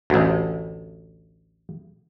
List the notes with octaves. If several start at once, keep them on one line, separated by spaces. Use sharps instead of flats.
A1 D2